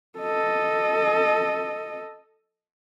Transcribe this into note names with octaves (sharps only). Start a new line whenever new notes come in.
A4 D#5